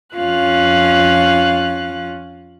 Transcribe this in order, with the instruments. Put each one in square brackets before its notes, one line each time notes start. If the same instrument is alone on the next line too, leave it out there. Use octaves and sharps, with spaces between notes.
[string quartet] F2 C#4 F4 F5 F#6